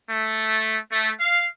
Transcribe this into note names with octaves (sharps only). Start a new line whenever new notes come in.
A3
A3
F5